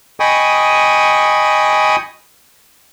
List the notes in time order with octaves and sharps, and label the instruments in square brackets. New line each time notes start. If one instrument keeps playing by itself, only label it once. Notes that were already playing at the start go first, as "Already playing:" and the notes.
[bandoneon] D#5 G5 G#5 B5 C#6 D#6